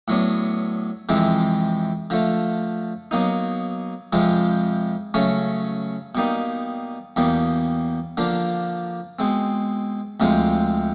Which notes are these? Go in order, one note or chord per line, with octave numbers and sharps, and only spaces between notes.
A2 F#3 B3 D4
F2 C3 E3 G#3 C4
D3 F3 A3
B2 F#3 A#3 D#4
F2 C3 F3 G#3
C#3 F#3 A3 C#4
B2 G3 A#3 D#4
E2 B2 G3 A#3
D3 F3 A#3 D4
B2 G#3 C4
D2 C3 F3 G#3 C4